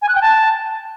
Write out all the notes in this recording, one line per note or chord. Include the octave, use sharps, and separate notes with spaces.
G#5
F#6
G5
A5